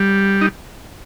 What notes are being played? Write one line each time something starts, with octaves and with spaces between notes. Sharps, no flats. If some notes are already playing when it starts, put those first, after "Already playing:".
Already playing: G3
D#4